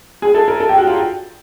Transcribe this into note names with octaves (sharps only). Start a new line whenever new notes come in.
G#4
A4
A#4
A4
G4
F#4
F4